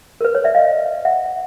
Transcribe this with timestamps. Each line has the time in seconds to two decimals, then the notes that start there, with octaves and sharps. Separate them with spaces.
0.21 A#4
0.25 B4
0.35 B4 C#5
0.44 D5 E5
0.55 D#5 F5
1.05 E5 F#5